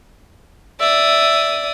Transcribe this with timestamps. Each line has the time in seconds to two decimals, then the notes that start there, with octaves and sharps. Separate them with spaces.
0.80 D5 E5 D#6